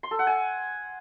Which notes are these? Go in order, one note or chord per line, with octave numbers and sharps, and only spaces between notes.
C6
A4
F#5
G#5